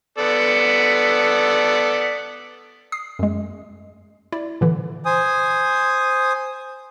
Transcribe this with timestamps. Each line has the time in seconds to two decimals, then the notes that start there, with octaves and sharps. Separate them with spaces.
0.18 B3 A4 D5
2.92 D#6 C7
3.19 F#2 G#3
4.32 E4 D5
4.61 A#2 D3 E3
5.06 C5 G#5 D#6